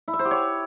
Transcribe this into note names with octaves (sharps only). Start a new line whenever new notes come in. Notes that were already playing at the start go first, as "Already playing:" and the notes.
E4
E5
C5
G4
C#5